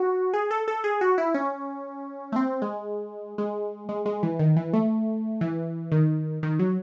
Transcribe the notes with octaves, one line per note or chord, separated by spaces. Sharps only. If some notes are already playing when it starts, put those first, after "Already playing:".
Already playing: F#4
G#4
A4
A4
G#4
F#4
E4
C#4
A3
C4
G#3
G#3
G#3
G#3
E3
D#3
E3
A3
E3
D#3
D#3
F#3